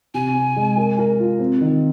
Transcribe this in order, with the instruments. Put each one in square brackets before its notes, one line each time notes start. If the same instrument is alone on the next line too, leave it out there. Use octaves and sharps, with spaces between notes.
[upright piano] C3 [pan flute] G#5
[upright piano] C4
G#3
A#4
A#4
F4
C4
D#3